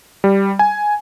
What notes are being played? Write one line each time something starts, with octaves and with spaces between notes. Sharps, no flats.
G3
G#5